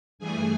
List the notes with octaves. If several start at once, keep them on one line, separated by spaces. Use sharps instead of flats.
G2 E3 A3 G#4 G#5